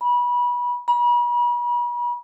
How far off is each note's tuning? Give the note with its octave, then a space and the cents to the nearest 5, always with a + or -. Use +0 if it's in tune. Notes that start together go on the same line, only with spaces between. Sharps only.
B5 -25
B5 -40